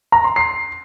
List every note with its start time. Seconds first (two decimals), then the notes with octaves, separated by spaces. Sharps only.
0.12 A#5
0.24 C6
0.36 C7